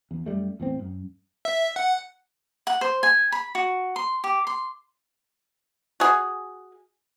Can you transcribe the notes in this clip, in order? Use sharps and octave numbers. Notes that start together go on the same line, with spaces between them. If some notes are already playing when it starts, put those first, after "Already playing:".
E2
F#2 G3 A3
E2 A2 C4
F#2
E5
F#5
F#5
C5
G#5
B5
F#4
C6
G4
C6
F#4 G#4